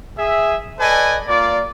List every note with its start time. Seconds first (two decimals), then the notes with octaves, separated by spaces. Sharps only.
0.18 G#4 E5
0.79 A4 B4 D5 D#5 G#5
1.28 A#3 F4 D5